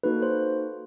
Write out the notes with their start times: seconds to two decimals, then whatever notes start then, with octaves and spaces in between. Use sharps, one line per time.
0.03 A#3 D#4 F#4 A4 B4
0.22 C5